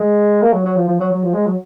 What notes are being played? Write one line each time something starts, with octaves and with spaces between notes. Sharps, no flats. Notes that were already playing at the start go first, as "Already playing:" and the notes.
Already playing: G#3
A#3
F#3
F#3
F3
F3
F#3
F#3
F3
G#3
F#3